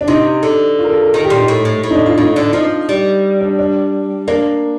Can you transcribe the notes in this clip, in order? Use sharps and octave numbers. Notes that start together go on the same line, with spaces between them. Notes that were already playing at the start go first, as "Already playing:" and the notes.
D4
C3 D#4
D3
F4
A#4
A4
A#4
D#3 A#4
G4
A#2
D#4
A2
A2
A2
D#4
D4
F4
A2 D#4
D3 D4
F3 D#4
G3
D4
D4
A#3 D4